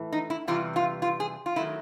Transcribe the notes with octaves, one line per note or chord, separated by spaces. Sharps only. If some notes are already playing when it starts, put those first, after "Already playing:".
Already playing: A2 E3
D#4
E4
E2 C3 E3 G3 F4
F4
F4
G#4
F4
D#3 F#3 A3 E4